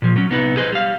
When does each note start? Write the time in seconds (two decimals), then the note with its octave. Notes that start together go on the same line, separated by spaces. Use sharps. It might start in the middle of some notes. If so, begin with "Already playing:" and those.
0.02 A#2 F3
0.16 F#3 C#4
0.30 C2 B3 D#4 B4
0.57 G#4 B4 C5 D#5
0.72 G3 F5